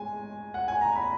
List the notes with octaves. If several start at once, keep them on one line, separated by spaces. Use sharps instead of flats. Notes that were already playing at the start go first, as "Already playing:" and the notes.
Already playing: G#3 G#5
F#5
G#5
A#5
B5